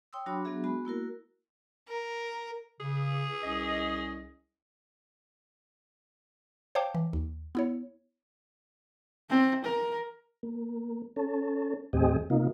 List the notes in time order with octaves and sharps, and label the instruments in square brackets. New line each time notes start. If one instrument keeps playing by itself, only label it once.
[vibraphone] C#5 G5 C6 D#6 E6
F#3 D4 F#4 C#5 B5 D6
F#3 B3 D4 F#4 G#4 E5
G#3 B3 F#4 B5
A#3 E4 F#4 A#4
[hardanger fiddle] A#4
[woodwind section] C#3 [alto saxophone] G#4
[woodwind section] C2 C#4 D#5
[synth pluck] C5 C#5 F5 G5 A5 D6
E3
D#2
B3 E4 C#5
[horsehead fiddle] C4
A#4
[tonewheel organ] A#3
C#4 A4
D#2 A2 C4 G4 G#4 D#5
C3 A#3 D#4 F4